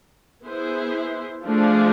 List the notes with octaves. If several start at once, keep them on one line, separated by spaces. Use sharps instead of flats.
B3 E4 G#4 C5
F3 A3 D4 F4 G#4